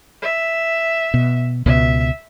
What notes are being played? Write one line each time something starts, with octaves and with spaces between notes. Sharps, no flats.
E5
B2
C#2 B2 E5